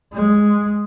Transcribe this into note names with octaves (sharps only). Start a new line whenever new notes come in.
G#3